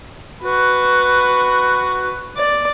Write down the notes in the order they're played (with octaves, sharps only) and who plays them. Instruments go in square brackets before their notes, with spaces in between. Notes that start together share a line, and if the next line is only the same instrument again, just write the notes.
[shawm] F#4 [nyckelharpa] B4
[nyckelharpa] D5